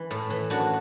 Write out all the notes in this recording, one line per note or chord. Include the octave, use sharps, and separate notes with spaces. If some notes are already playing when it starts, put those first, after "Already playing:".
Already playing: E3
A2
E3
F#2 D4 F#4